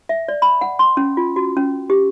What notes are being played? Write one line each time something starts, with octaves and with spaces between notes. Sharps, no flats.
E5
D5
B5
F#5
C6
C#4
F4
F#4
C#4
G4